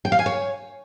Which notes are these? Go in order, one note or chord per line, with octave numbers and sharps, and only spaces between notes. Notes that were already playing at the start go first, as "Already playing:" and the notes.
G5
F5
G#5
C#5